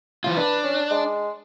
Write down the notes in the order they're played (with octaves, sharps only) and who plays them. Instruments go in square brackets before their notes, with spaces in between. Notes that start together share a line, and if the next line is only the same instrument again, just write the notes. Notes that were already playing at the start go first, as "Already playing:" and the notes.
[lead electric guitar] E3 F4
[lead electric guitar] D4 [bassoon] B4
[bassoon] C#4
G#3